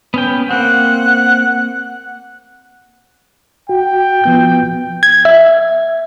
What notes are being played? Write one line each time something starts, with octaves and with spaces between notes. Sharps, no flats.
B3 C#4 G5
A#3 C4 F#5
F#4 G5
F3 B3 G6
G#6
E5